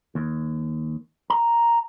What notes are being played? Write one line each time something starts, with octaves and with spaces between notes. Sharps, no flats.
D#2
A#5